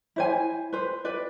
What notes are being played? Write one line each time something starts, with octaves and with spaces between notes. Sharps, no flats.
E4 C5 G#5
B4 C5
B4 D5